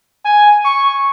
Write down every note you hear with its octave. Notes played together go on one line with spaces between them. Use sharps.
G#5
C#6